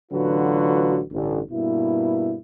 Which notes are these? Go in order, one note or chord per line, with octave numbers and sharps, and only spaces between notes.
A1 D3 F#3 F4 F#4 B4
A1 G2 D3
G2 B2 A#3 E4